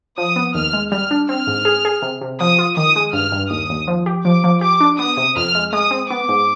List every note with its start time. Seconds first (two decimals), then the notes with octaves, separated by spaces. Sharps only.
0.18 F3 D#6
0.36 B3
0.54 D#2 F6
0.73 G#3
0.92 G3 F6
1.11 D4
1.29 C4 F6
1.47 G#2
1.65 G#4
1.85 G#4
2.02 C3
2.21 C3
2.40 F3 D#6
2.58 F4
2.76 D#3 D#6
2.96 G#3
3.13 G2 F6
3.32 G2
3.50 D#2 D#6
3.70 D#2
3.88 F3
4.06 G4
4.25 F3 D6
4.44 F3
4.61 G4 D6
4.80 D4
4.98 B3 D#6
5.17 C3
5.36 F2 F6
5.55 G#3
5.73 G#3 D#6
5.91 C4
6.10 B3 D6
6.29 G#2